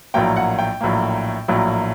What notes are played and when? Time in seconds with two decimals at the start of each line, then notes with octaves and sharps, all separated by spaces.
0.14 A#1 A2 F#3 A#3 G5
0.37 F#5
0.59 G5
0.81 A#1 A2 F#3 A#3
1.48 A#1 A2 F#3 A#3